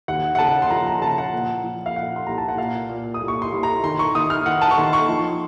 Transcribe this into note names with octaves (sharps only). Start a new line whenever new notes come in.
D#2 F#5
F#5
C#3 A5
C6
F3 A#5
A#5
C#3 A5
F#5
A#2
F3
F5
A#2 F#5
C6
C2 A#5
A5
F#5
A#2 F5
A#2
D#6
C2
C#6
C6
C2
A#5
D#3 C6
C#6
D#3 D#6
F6
D#3 F#5
A5
C#6
D#3 C6
C#6
F3 C6